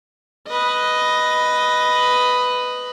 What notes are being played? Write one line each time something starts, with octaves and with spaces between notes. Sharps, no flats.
B4 D#5